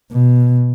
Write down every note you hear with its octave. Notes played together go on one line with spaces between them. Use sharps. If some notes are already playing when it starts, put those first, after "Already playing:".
B2